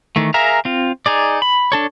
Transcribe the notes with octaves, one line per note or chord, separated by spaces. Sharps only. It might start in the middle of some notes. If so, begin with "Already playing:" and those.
D#3 E3 A3
G#4 A#4 E5 F5 A#5
C4 F4
D#4 G#4 D5
B5
D4 A4 C#5